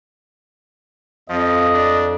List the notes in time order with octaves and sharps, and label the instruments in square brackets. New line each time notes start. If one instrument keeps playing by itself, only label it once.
[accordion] F2 [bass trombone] F3 [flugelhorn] D#5
[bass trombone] D4